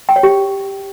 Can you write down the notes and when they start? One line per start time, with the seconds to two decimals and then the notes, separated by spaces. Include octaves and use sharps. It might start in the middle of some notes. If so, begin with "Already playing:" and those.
0.09 G5
0.16 C#5
0.23 G4